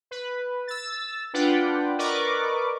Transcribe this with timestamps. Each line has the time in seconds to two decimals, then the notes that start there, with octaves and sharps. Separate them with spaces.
0.11 B4
0.67 E6 A6
1.33 D4 F4 B4 D5 F#5 G5
1.98 A#4 B4 D5 D#5 C#6 D6